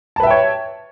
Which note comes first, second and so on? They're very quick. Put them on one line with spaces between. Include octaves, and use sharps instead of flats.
A5 B4 E5 G5 C#5